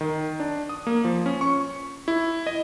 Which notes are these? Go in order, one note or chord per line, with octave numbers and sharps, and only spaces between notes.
D#3
D4
D#6
A#3
F3
C#4
C#6
E4
D#5